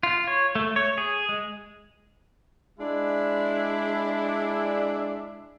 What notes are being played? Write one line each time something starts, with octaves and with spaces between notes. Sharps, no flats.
F4
C#5
A3
C#5
G#4
G#3
G#3 D4 E4